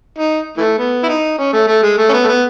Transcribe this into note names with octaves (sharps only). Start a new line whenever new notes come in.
D#4
E3 A3
B3
E4
D#4
C#4
A3
A3
G#3
A3
C#4
B3
A3
B3